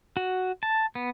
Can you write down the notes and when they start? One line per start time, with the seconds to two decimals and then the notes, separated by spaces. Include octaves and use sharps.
0.17 F#4
0.63 A5
0.95 B3